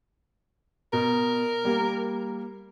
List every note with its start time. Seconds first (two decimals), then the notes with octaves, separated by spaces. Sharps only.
0.93 B2 A#4
1.65 G3 A#3